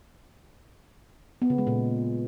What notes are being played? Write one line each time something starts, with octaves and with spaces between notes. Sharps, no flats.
B3
C#3
G#3
A#2